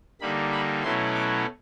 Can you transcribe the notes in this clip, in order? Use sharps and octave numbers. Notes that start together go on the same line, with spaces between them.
D3 G3 A#3 D#4 B5
B5
B2 F#3 A3 C#4 E4 C6
D6